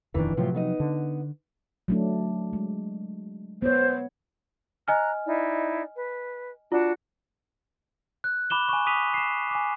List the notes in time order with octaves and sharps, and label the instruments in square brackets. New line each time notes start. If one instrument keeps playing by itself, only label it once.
[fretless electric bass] D#1 F2 D#3 [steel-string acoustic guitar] E3 D4
[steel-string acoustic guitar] A2 F4 G4 [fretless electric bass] C3 F3 F#3
[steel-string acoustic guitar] B3 D#4 D#5
[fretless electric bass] D3
[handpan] F#3 A3 D4
G#3
[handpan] B3 C#5 [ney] C5
[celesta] D#5 G#5 F6 [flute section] A#5 F#6
[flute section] D#4 E4 D5
B4
[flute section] D4 F#4 [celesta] F4
[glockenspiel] F#6
B5 D6 E7 G7
G#5 C#6
D6 D#6 B6 D#7 F7
C7 E7
G#5 D6